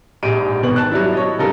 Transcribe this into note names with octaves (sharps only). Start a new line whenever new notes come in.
A#1 G#2 G4 D7 D#7
G#1 B2 D#3 B3 F#7
A5 F#6
F#3 G3 D4 E4
C#5 D#5
C#3 F3 G3 D#4 A4 A#4